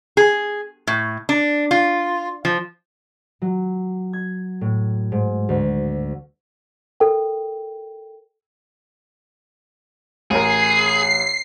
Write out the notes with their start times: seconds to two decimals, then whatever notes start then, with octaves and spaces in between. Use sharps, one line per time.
0.17 G#4
0.87 A2
1.29 D4
1.71 F4
2.45 F3
3.42 F#3
4.13 G#6
4.61 A2
5.12 G#2
5.49 D2
7.00 A4 A#4 G5
10.31 A1 G#4 A#4 C7